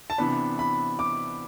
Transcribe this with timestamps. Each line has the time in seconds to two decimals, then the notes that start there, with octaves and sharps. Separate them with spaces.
0.10 A5
0.18 C3 E3 B3 D4 B5
0.59 B5
0.99 D6